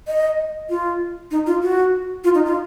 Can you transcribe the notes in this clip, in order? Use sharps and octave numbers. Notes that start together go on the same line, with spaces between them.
D#5
F4
D#4
F4
F#4
F4
D#4
F4